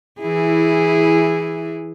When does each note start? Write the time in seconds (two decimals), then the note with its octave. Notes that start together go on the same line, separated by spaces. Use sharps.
0.21 E3 E4 G#4